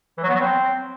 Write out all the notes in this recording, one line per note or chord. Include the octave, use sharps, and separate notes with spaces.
E3
F#3
B3
F#3
C4